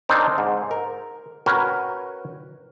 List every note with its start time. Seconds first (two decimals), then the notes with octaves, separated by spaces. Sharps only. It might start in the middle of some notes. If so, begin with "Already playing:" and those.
0.09 C4 D4 D#4 A#4 C5 C#5
0.38 G#2
0.71 A#4
1.46 C#4 F#4 A#4 B4 G5 G#5